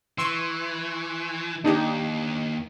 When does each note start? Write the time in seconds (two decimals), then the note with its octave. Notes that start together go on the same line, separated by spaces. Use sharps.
0.18 E3 C6 C#6 E6
1.64 D#2 D4 D#4 G4